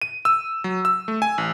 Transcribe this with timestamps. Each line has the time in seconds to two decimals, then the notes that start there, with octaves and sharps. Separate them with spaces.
0.02 D#7
0.25 E6
0.64 F#3
0.85 E6
1.08 A3
1.22 G#5
1.38 A1